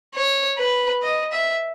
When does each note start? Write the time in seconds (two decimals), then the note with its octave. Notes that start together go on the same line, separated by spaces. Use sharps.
0.14 C#5
0.58 B4
1.03 D#5
1.32 E5